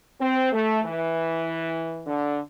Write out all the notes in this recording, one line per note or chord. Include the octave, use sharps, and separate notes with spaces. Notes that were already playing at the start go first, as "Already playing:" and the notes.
C4
A3
E3
D3